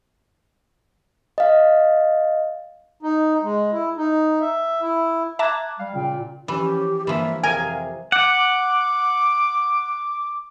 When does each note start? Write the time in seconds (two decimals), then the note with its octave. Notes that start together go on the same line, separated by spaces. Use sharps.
1.38 D#5 F5
3.03 D#4
3.43 G#3
3.72 E4
3.97 D#4
4.41 E5
4.81 E4
5.39 E5 A5 A#5 D6 F#6 G#6
5.79 G3 F5
5.95 A#2 C#3 G5
6.48 E3 F3 C#4 G4
7.07 G2 E3 F3 A#3 E5
7.43 C2 F2 C3 A#4 F5 G#5
8.12 F#5 D6